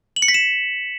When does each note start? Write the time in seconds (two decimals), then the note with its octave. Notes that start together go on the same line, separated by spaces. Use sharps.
0.16 F#7
0.22 C#7
0.28 B6
0.34 E7